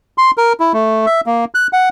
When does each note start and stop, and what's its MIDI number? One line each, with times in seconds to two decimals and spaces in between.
0.18 0.31 84
0.37 0.53 70
0.60 0.73 64
0.73 1.06 57
1.06 1.21 76
1.26 1.45 58
1.55 1.67 90
1.73 1.89 78